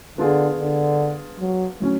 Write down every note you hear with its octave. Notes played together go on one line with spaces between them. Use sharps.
D3 B3 D4 F4 G#4
D3
F#3
A2 F#3 C#4